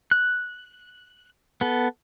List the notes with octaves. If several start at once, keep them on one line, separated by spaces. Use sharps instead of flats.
F#6
B3 A4